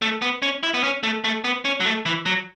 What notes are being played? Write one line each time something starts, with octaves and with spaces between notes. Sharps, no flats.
A3
B3
C#4
E4
B3
C#4
A3
A3
B3
C#4
F#3
A3
E3
F#3